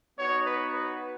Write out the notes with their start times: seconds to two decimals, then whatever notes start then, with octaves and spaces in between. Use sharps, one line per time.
0.17 B3 D#4 F#4 C#5
0.45 B4
0.73 B4